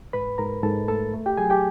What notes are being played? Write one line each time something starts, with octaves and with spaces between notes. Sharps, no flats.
G#2 B4 B5
G#2 A#4 A#5
G#2 A4 A5
A3 A4 A5
A3
G4 G5
F#3 G#4 G#5
G4 G5